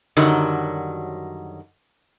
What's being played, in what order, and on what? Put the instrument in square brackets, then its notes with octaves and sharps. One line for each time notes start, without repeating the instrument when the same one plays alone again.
[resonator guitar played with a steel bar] F#2 D3 D#3 F#3 G3